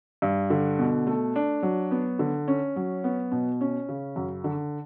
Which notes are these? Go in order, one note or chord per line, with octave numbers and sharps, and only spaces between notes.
G2
D3
B2
A3
D4
F#3
B3
D3
C#4
F#3
B3
B2
C#4
C#3
F#2
D3